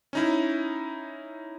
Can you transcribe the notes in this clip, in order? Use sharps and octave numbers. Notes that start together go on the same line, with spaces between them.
C#4 D#4 E4